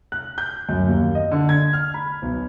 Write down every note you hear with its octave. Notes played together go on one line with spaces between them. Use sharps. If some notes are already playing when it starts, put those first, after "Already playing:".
F#6
G6
F#2
D#2
D#5
D3
G#6
F6
B5
B1